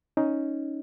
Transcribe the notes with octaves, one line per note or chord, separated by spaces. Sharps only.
C#4 D#4